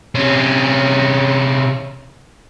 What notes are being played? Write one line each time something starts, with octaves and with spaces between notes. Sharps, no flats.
C3 C#4